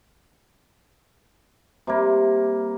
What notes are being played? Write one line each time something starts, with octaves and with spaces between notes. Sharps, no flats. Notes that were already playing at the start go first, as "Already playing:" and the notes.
C3 G3 A#3